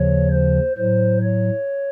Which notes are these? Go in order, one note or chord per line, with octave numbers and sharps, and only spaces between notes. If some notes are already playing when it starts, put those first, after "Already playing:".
Already playing: D#2 C#3 F3 C#5
C5
A2 F#3 C5
C#5